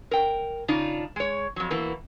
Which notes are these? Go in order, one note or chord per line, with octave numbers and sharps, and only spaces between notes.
A#4 G5
C#3 D4 D#4 F4
G#3 C#5
F2 F#3
B2 E3 A#3